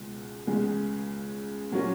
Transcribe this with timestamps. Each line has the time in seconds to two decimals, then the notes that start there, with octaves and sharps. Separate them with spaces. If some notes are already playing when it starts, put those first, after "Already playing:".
Already playing: C#2 B2 G#3
0.47 C#2 C#3 G#3
1.71 A#2 F#3 A#3 C#4 F#4